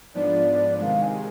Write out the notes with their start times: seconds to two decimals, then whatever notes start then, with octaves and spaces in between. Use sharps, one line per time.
0.15 G#2 F3 B3 D4 D5
0.80 C3 D#3 G#3 F5
1.02 G#5